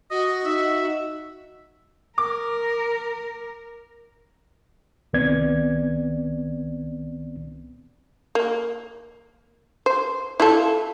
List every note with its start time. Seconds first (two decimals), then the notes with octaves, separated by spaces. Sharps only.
0.11 F#4 D#5
0.45 D#4 E5
2.18 A#4 D6
5.13 C2 D#3 B3 C4 D5 G#6
8.35 A#3
9.86 C5
10.40 E4 F4 A4